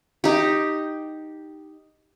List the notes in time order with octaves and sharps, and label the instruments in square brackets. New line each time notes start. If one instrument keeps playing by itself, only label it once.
[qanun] D#4 G4